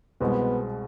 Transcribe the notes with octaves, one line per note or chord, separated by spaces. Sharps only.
C2 B2 G#3 B3 C4